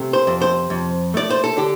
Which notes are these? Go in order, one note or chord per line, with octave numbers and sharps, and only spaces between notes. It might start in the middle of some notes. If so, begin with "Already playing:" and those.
Already playing: C3 A3
C5
F2
C5
F2
A3 D5
C5
A4
D3 G4